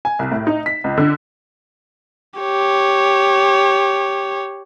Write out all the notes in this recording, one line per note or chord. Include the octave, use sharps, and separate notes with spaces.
G#5
C2
A2
D#4
B6
C#2
D3
G4 C#5